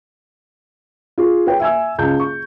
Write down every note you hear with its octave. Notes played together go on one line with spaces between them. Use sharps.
F4 G#4
G#4 B4 C#5 G5
E5 G#5 E6
C#2 A5 G6
C#6